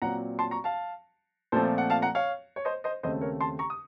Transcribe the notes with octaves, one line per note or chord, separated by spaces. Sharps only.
A#2 F#3 C4 F#5 A#5
A5 C6
A#5 C#6
F5 A5
A#2 F3 A3 C4 A4 C5
F#5
F5 A5
F#5 A#5
C#5 F5
C#5
C5 D#5
C5 D#5
D#2 C#3 A3 C4 C5 D#5
A#4 C#5
A5 C6
A#5 C#6
D#6